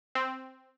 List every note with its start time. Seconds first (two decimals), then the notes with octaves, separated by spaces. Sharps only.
0.15 C4